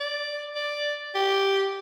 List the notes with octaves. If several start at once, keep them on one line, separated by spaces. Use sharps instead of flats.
D5
D5
G4